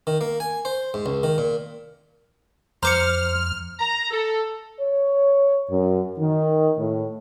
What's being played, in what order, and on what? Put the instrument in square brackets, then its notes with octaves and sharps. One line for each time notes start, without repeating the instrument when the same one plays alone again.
[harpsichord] D#3
A#3
G#5
C5
G#2
C#2
D#3
A#2
[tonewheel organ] F2 [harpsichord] C5 [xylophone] A#5 D6 C#7 [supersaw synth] F6
[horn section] A#5
A4
[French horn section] C#5
F#2
D#3
A2